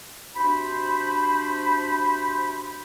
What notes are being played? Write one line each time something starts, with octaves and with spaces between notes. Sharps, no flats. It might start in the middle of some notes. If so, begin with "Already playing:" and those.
C3 D4 F#4 C5 B5